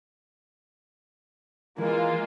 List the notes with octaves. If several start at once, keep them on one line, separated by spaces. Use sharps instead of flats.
E3 G#3 A#3 F4